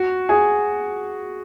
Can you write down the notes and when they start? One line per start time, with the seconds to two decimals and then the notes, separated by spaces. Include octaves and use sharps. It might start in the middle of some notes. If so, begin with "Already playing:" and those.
Already playing: F#4
0.29 G#4